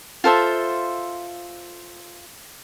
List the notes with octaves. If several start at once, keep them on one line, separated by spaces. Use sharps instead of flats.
F4 A4 C5 E5